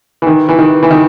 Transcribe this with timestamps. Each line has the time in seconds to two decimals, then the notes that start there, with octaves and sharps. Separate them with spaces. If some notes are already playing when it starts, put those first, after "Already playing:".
0.22 E3
0.27 D#3
0.49 E3
0.59 D#3
0.83 E3
0.91 D#3